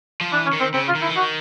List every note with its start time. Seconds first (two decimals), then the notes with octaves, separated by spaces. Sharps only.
0.21 F3
0.32 E3 D4
0.46 C#4
0.53 D#3
0.60 C4
0.74 C#3 C4
0.88 F4
0.95 D#3
1.02 E4
1.09 E3
1.15 D#3 F#4